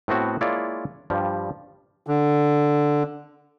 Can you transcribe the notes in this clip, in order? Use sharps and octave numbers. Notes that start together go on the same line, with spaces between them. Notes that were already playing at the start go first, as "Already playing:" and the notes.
A2 B3 C4 F#4
G#3 A#3 E4 F4 C#5 D5
G2 F3 G3
D3